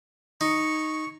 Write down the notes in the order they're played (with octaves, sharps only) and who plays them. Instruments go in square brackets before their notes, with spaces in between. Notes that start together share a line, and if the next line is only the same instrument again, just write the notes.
[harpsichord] D#4 [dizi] C#6